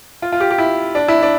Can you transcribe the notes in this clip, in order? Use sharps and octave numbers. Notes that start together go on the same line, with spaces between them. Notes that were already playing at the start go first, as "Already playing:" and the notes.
F4
F4
G4
G4
E4
D4
E4
D4